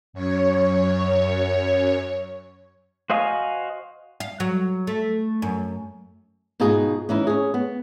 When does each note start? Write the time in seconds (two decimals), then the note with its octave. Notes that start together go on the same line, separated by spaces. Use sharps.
0.13 F#2 C#5
3.10 F#4 C5 D#5 F5 G#5
4.20 F5
4.40 F#3
4.87 A3
5.42 F#2
6.60 G#2 B2 D#4 F4 G#4
7.09 E3 C#4 D#4 E4
7.27 C#4 G#4
7.54 B3